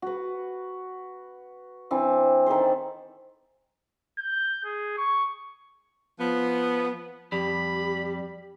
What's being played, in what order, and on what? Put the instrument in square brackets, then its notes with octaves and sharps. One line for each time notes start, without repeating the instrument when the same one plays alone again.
[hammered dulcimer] F#4 B4
E3 C4 D4
D#3 A4 B4 C5
[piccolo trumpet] G6
G#4
C#6
[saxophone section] F3 B3
[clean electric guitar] F2 [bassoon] G3 [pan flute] G4 [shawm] B5